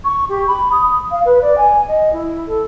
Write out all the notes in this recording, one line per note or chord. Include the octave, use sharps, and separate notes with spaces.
C#6
G4
B5
D#6
F5
B4
D5
G#5
D#5
E4
A4